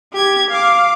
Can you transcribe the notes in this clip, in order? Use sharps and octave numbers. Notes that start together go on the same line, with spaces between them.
G4 G#6
F5 D6